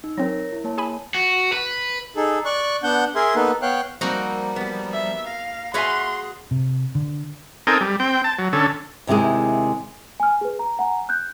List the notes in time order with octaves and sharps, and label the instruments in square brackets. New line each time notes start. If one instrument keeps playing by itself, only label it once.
[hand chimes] D#4
[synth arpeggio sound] F#3 C4 [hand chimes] A#4 C#5 A#6
[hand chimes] E4
A#3 C#5 A5
[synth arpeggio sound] G#4 G#5 B5
[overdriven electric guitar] F#4
B4
[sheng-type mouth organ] D#4 G#4 A4
D5 C#6 F#6
B3 D4 F#5 G6
G#4 A#4 E5 G#5 C6
A#3 B3 D#4 A4 B4
B3 C#5 F5 G5 F#6
[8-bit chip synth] F3 G3 [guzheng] A#3 D#4 F#4 [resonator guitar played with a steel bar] C4
[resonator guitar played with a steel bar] B3 G4
[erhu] E5
[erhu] F5 [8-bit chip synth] A#6
[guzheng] F#4 B4 F5 [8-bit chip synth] G#4 [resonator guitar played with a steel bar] C#5 E5 G#5 [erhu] C6
[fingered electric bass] C3
D3
[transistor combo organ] C4 D#4 A4 A#4 G5 G#5
G3
C4 G5
A5
F#3
D3 C#4 A4
[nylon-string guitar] D#2 C3 G#3 E4 G#4
[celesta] G#5 F6
G#4 B4
A#5
F#5 G#5 A#5
F#6 G6